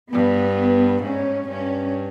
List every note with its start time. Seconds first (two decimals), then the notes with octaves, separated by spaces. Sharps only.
0.12 G2 B3
1.03 G#2 C#4
1.48 G2 C#4